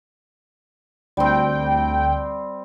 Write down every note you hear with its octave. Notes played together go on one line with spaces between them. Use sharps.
D2 G3 C4 G5